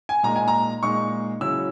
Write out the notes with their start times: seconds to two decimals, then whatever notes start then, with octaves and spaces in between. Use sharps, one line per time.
0.09 G#5
0.23 A#2 G#3 D#4 A#5
0.36 G#5
0.48 A#5
0.83 A#2 G#3 D#4 C#6
1.41 C#3 F#3 C#4 E4 E6